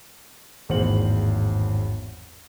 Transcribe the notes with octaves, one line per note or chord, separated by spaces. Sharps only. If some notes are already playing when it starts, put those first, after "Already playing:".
G#1 E2 A2 C5 F#7